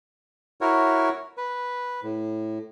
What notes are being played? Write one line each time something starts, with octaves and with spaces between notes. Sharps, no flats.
E4 F#4 A#4 C#5
B4
A2